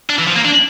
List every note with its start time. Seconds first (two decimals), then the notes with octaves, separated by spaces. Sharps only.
0.10 D4
0.19 E3
0.27 F3
0.36 A#3
0.45 D4